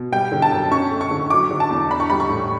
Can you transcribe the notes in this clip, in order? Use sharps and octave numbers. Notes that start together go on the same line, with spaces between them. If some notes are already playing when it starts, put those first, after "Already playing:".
Already playing: B2
G3 G5
D3
A5
F#2
C#4 C#6
A3
C#6
D3
F#3 D6
D3
A5
E2
D4 B5
C#6
G3 B5
C#6
A2